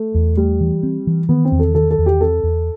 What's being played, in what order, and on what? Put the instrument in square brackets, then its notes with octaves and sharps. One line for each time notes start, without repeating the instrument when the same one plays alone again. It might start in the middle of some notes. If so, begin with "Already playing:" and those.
Already playing: [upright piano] A3
[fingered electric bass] E2
[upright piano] G3 [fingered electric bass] A3
[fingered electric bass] E3
C4
E3
[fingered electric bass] D#3 [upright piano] B3
[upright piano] C4
[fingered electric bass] E2
[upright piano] A4
[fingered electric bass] D#3 [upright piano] A4
[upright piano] A4
[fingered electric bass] E2
[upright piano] G4
[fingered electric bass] C4 [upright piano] A4
[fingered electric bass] E2